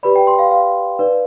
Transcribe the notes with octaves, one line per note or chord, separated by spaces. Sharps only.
G4 B4 D5 B5
G5
C6
F5
F5
D#4 B4 D5